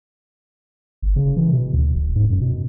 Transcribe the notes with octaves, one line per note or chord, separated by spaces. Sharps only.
G1
C#3
E3
B2
D2
D#1
G#2
F#2
B2